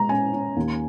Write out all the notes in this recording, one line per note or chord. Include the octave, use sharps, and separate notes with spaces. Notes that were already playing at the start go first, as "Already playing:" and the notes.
Already playing: G#3 A#5
C#4 G#5
C#4
D#2